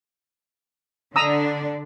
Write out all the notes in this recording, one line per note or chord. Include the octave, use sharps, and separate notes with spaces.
D3 D4 A#5 D#6 E6